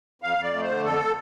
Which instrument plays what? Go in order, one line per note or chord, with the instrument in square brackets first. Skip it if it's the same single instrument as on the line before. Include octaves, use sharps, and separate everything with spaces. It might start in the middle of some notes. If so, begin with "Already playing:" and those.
[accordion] F2 F5
F2 D5
A3
D3 C5
F2 A4